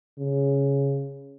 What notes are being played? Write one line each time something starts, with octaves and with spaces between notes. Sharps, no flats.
C#3